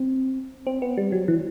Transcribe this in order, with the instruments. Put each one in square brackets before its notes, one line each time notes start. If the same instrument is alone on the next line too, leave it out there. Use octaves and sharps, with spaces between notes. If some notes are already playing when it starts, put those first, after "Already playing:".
Already playing: [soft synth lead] C4
C4
B3
G3
F#3
E3